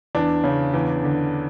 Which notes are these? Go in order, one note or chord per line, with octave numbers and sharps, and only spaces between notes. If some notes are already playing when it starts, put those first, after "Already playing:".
E2 D4
C#3
E2
D3